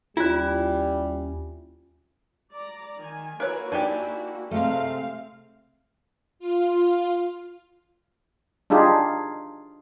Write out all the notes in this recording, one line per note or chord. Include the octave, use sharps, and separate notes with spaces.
D#2 G3 C#4 E4 F4 C5
D5 A#5
D#3 G#5
A#3 E4 F#4 A#4 B4 C#5
D4 D#4 G4 G#5
C3 G#3 A3 C4 F5
F4
D4 D#4 F4 G4 G#4